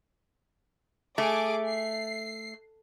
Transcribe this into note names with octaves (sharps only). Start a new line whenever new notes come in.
A3 G#4 D6
C7